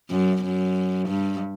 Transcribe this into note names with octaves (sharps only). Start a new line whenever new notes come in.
F#2
F#2
G2